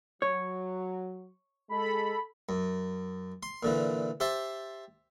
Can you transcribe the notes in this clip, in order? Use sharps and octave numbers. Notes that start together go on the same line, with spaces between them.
F#3 C#5
G#3 A4 B5
F#2
C6
A#2 D3 E3
G4 C5 E5 A5